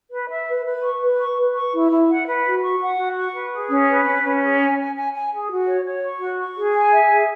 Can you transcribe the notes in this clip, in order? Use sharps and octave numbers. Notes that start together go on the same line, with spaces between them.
B4
E5
B4
B4
C#6
B4
C#6
B4
C#6
E4
E4
F#5
B4
F#4
C#6
F#5
F#4
C#6
B4
G#4
C#4
B4
C#4
C#4
G#4
G#5
G#5
G#5
G#5
G#4
F#4
C#5
C#5
C#6
F#4
C#6
G#4
G#5
E5
G#4